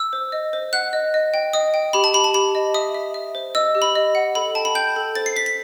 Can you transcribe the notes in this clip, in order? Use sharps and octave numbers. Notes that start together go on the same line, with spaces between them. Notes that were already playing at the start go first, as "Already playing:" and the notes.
Already playing: E6
C5
D#5
C5
F#5 F#6
D#5
D#5
G5
D#5 D#6
G5
G4 B5
A5
G4 B5
A5
G4 B5
D#5
E5 D#6
E5
E5
C5
D#5 E6
G4
B5
D#5
F#5
A4 B5
G5 A5
B5
G5 G6
A4
C5 A6
C7
C5 B6
B6